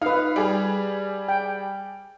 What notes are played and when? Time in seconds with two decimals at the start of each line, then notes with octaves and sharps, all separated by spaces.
0.02 D#4 B4 F5
0.36 G3 G#4
1.29 G5